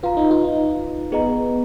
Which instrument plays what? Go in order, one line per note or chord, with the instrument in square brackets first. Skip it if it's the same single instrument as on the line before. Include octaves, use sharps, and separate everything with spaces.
[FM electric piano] F4 [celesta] B4 F5 A#5
[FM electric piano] D#4
F4
D#4
[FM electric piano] B3 [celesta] G#4 D#5 A#5